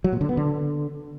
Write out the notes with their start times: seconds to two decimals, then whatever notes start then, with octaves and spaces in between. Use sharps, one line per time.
0.04 F#3
0.13 A#2
0.21 D3
0.29 B3
0.37 D3